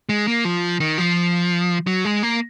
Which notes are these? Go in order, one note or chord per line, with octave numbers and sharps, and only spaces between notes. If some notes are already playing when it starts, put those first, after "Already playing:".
G#3
A#3
F3
D#3
F3
F#3
G#3
A#3